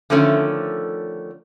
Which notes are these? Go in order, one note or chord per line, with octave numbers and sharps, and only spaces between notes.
D3 D#3 F3 A3 C#4